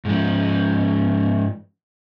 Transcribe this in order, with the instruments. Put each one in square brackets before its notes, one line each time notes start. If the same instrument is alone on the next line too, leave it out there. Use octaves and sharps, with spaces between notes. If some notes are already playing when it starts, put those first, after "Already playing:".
[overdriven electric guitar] G#2 F3